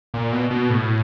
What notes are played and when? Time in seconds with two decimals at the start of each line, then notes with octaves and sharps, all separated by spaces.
0.14 A#2
0.32 B2
0.50 B2
0.70 A2